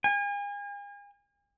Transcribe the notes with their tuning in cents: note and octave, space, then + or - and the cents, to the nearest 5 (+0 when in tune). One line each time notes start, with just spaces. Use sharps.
G#5 -40